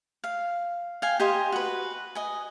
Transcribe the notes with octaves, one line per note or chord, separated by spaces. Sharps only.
F5
F5 G5 G#5
G4 D#5 G#5 C6
F#4 B4
D#5 G#5